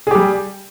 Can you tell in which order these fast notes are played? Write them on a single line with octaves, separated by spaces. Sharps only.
G#4 G4 G3